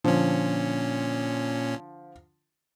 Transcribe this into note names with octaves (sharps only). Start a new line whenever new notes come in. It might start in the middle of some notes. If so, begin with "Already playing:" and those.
A#2 D3 F3 C#4